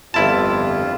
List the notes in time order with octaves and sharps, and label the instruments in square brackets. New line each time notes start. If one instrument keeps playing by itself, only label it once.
[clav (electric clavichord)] G1 E4 A5 [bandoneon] F2 F4